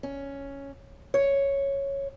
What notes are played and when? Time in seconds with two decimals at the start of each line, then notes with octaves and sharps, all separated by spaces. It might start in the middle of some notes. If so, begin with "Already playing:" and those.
0.03 C#4
1.14 C#5